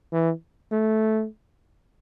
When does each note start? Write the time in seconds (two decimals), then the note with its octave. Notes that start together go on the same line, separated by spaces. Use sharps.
0.12 E3
0.72 A3